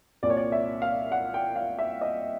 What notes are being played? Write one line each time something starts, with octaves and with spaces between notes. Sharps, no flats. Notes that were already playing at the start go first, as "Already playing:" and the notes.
C2 A#2 G3 D5
C#5
D5
E5
F5
F#5
G5
F5
E5
D#5